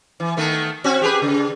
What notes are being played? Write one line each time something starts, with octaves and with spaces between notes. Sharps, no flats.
E3
D#3 A3 B3
C4 C#4 F#4
G4 G#4 B4
C#3